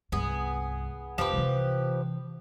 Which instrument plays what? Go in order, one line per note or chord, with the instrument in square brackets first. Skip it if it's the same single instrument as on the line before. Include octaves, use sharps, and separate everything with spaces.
[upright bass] C2 G2 [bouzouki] B3 G#4
[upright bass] F1 C4 [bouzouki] F3 G4 B4
[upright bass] C3 E3